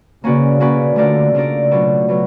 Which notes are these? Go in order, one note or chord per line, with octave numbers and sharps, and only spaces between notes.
C#3 A#3 C#4 F#4 B4 D5
A#3 C#4 F#4 B4 D5
D3 A3 D4 F4 A#4 D5
C#3 A3 D4 F4 A#4 D5
B2 F#3 B3 D4 F4
B2 F#3 B3